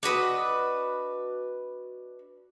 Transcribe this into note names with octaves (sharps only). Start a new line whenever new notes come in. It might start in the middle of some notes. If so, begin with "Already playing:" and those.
D4 F#4 B4 D#5